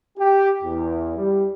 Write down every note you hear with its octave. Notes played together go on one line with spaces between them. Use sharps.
G4
E2
G3